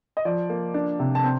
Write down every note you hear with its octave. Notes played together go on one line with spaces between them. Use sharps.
D#5
F3 D5
A#3
D4
C3
A5
C4